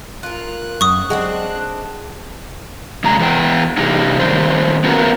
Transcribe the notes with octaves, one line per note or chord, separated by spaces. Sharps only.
F4 A#4 F#6
F#2 C#6 D#6
G#3 C4 D4 G#4 F#5
G2 C3 F#3 G#3 A#5
E2 E3 B3 G5
C3 E3 G3 D#4
D#3 G3 C4 C5
B3 C4 F#4 A#4 B4